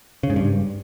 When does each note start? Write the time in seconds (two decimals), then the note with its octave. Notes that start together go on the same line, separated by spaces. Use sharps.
0.23 C#3
0.30 G#2
0.36 G2